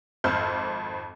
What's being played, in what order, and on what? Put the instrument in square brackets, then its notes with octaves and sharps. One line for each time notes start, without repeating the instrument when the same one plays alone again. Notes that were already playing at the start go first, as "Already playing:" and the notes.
[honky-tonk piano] G#1 F2 C5 E6 F6 G6